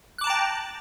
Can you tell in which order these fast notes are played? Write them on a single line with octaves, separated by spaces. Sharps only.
F#6 D6 A5 A#5 G5